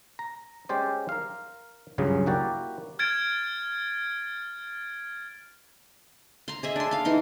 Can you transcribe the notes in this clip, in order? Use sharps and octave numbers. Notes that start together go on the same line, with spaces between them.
A#5
G#3 C#4 G4 C5 D5
A#4 F5
C#2 G2 C#3 F#3 G#4
A#3 E4 F#4 G4 D5
F6 G#6 A6 D7
A#5 C6
G#4 D#5 E5
D4 C6
F5 C6
E3 D#4 C6